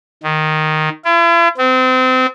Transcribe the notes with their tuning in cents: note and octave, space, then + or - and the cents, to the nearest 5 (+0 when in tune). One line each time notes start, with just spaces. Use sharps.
D#3 -5
E4 +45
C4 -30